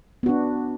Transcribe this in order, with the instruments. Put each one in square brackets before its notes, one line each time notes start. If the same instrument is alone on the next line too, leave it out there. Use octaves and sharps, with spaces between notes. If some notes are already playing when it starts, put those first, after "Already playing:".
[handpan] B3
F#4
D4